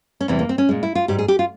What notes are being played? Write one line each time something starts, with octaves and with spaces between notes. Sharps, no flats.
C#4
E2 C3 E3 G3 C4
A#3
C4
C#4
A#2 G#3
E4
F4
G#2 G3 G4
G#4
G4
F4